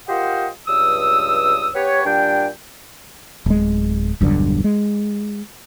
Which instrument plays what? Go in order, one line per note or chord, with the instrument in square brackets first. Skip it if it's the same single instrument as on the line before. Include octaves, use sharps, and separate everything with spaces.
[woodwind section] F4 G4 A#4 C5 D#5 F#5
C#2 G2 D#6 E6
B3 G4 B4 C#5
A#2 G3 D4 G5
[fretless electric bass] D1 G#3
E1 B1 G2 D3
G#3